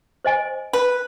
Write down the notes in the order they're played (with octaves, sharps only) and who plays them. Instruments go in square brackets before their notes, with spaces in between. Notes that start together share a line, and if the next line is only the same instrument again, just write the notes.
[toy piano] C5 D#5 G#5
[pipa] B4